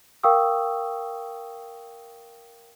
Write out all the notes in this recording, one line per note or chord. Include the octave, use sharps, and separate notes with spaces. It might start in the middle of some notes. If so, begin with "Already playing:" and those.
A#4 F5 G5 C#6 D#6 E6